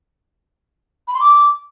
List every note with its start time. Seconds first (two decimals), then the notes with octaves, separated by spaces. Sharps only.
1.07 B5
1.14 C6
1.20 D6